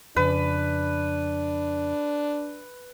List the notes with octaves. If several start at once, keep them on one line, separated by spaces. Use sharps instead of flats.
F2 C#3 D4 B4